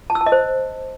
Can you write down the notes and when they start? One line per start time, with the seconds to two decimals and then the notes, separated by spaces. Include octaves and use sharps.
0.10 A5
0.15 E6
0.21 A5
0.26 D#5
0.32 C5